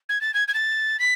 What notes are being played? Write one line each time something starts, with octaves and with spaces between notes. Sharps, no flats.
G#6
A6
G#6
G#6
A6
B6